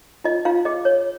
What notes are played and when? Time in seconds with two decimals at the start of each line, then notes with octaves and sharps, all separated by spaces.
0.24 F4 D#5
0.45 F4 F5
0.65 G#4 D#5
0.85 C#5